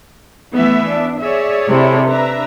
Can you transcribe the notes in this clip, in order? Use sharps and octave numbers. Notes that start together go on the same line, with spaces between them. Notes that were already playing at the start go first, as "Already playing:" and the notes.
E3 A3 B3 E5
D4
G#4 C#5 D5 E5
C3 E4 A4
D4 B4 E5 A#5